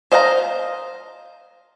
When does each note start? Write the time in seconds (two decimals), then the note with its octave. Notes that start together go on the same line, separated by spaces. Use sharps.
0.12 C5 D#5 F5 F#5 A#5